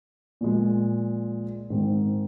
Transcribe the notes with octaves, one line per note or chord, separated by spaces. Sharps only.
A#2 F3 G#3
G#2 D#3 G#3 C4